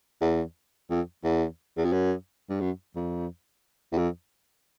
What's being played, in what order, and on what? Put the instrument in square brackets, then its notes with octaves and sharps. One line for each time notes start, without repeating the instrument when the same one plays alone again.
[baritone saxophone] E2
F2
E2
E2
F2
F#2
G2
F#2
F2
E2
F2